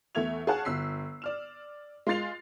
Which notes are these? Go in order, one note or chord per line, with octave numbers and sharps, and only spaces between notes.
E2 A3 E5 G#6 F7
G#4 C#5 F5 F#5 A5 F#6
G1 E6 B6 C7
D5 F6 E7
G#3 F4 C6 A6 C7 F7